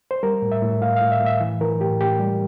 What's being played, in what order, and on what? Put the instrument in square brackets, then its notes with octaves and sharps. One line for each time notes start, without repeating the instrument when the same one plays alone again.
[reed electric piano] C5
G3 A#4
A2
E5
A2
A2 F5
A2 F5
E5
A2
E5
E3
E3 A#4
A2 G4
A2 G4
G3